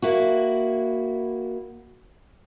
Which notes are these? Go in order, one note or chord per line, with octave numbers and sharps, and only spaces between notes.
A#3 E4 F#4